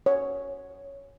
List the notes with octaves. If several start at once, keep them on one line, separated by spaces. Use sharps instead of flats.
C#5